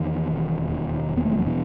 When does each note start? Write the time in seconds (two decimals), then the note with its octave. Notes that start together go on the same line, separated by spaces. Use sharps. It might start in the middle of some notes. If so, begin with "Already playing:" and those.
Already playing: E2 D#3
0.32 E1
0.69 D#2
1.09 E1
1.17 B3
1.25 A3
1.32 G#3
1.38 F#3
1.46 B2 E3